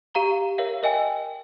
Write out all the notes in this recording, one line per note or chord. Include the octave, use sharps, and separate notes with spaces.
G4 F5 A#5 G7
A#4 C#5 E5 F5
A#4 D#5 G5 G#5